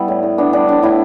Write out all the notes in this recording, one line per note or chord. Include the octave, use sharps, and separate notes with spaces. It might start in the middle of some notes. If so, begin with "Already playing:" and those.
Already playing: G3 B3 E4
A2
A2
B3 D4
G3 D4
A2 D4
A2 E4